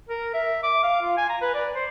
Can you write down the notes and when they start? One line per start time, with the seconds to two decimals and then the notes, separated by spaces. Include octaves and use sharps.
0.09 A#4
0.34 E5
0.63 D6
0.84 F5
1.02 F4
1.17 G#5
1.29 A#5
1.42 B4
1.55 D5
1.75 C5